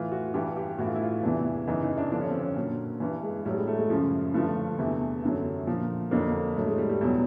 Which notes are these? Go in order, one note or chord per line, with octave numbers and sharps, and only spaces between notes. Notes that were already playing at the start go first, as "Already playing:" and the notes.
Already playing: A2 E3 F4
F#4
G2 E3 G4
G4
A2 E3 F#4
F4
E4
F4
E2 C3 E3 D4
F#2 C#3 E3 D#4
D#4
D4
G2 D3 F3 D4
C#4
C4
C#4
A#2 F#3
G2 E3
G#3
A2 F#3 G3
G#3
A3
G#3
F#2 C#3 F3
G2 D3 F3 A3
E2 C3 E3
F#2 D3 F#3
A#2 F3
F2 D3 F#3 A#3
A2 F#3 A3
G#3
G3
G3
E2 B2 F#3